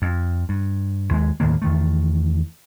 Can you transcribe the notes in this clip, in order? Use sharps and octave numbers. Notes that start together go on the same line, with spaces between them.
F2
G2
D#2 G#3
D#2 A2 D#3 A#3
E2 D#3 A3